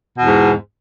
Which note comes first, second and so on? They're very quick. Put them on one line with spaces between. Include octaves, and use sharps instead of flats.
B2 E2 G#2